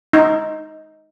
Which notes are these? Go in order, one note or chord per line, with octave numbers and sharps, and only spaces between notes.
D#4